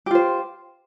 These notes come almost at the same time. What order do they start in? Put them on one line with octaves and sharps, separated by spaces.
G4 F4 C5